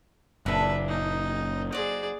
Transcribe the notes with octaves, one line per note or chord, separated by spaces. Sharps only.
F#1 A#2 D4 B4 E5
A#3 D#4
F#3 G#4 C5 D5